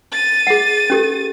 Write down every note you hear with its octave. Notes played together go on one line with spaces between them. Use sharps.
A6 D#7
G#4 F#5
C#4 G4 A4